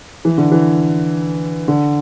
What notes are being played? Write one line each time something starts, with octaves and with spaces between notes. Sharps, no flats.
E3
D3
E3
D3